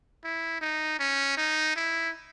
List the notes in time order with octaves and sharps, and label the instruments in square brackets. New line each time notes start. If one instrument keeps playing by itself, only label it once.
[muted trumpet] E4
D#4
C#4
D#4
E4